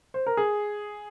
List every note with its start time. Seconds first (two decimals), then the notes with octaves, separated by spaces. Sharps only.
0.14 C5
0.26 A#4
0.37 G#4